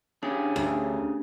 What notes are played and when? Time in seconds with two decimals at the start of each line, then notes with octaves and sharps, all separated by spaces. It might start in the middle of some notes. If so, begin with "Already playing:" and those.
0.23 C#4 D4 G4 G#4
0.56 D2